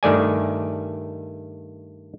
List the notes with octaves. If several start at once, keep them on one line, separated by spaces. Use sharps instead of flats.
G2 D#3 A3 D5 G#5